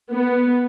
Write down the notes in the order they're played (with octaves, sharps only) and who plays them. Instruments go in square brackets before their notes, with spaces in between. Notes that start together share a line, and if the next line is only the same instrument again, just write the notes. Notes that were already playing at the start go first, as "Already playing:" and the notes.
[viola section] B3